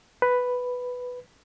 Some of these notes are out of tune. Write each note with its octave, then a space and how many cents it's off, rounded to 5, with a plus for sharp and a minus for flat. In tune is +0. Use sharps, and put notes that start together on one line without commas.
B4 +5